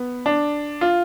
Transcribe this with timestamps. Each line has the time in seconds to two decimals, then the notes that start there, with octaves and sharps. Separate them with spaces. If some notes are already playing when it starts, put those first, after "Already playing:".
Already playing: B3
0.26 D4
0.81 F4